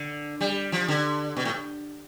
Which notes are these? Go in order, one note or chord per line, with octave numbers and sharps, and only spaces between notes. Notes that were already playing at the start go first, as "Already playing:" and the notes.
Already playing: D3
G3
F3
D3
B2
A2